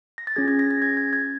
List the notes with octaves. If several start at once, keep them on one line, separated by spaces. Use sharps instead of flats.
A#6
A6
C#4 F4 G#4 G#6
G#6
A#6
A6
G#6
G#6
G#6